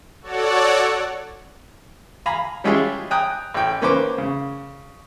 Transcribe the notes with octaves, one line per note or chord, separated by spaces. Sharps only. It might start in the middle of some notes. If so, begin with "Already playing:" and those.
F#4 A4 C#5 D5 F#5
F5 G#5 A#5 B5
G3 G#3 C#4 E4 F4 G#4
G5 G#5 A#5 D#6 F#6
A1 G5
A#3 C#4 B4 C5 D6
C#3